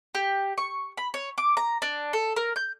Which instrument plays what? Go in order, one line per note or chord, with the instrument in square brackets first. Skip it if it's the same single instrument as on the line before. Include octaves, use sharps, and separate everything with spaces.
[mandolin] G4
C#6
B5
C#5
D6
A#5
D4
A4
A#4
G6